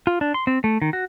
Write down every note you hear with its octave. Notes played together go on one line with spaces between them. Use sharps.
F4
D4
C6
C4
A3
D#3
F#4